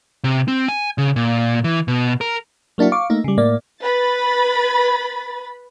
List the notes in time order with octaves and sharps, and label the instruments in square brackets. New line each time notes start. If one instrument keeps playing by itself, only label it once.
[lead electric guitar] C3
C4
G#5
C#3
A#2
E3
B2
A#4
[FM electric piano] F#3 A#3 D4 E4 F#4
F5 C#6 D6
A3 A#3 D#4
C#3 G3
A2 A#3 D5
[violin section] B4 B5 A6